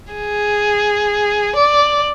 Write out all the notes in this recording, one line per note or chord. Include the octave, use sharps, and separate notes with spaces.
G#4
D5